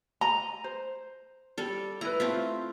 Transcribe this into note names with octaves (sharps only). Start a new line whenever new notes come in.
D#5 A#5
C5
G3 A4
E4 B4 A#5
A3 C4 F4